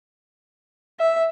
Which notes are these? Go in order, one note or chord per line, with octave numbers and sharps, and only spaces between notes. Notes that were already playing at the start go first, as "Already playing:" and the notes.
E5